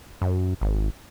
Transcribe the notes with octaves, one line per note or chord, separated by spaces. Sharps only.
F#2
G#1